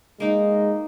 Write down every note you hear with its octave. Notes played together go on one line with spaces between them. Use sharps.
G#3 A#3 D#4